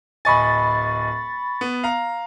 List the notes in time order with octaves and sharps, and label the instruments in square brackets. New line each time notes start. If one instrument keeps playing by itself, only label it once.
[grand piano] D1 D#5 G#5 [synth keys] B5 C#6 A6
[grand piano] B3
F5 A#5